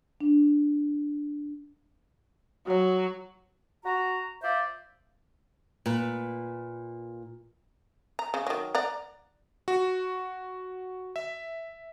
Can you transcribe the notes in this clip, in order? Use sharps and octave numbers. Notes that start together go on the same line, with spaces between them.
D4
F#3 F#4 C#5
F#4 A#5
F4 C5 D5 E5
A#2 B4
A#5
C#3
D#3 F#3
D5 F#5 A#5
F#4
E5